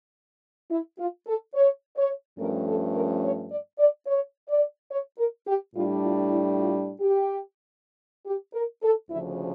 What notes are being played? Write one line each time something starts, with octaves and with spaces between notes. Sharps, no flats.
E4
F4
A4
C#5
C#5
G2 F3 A3 C#4 A#4
A4
A#4
C#5
D5
D5
C#5
D5
C#5
A#4
G4
A2 G3 D4 F4
F4
E4
F4
G4
G4
A#4
A4
D2 C#3 F3 E4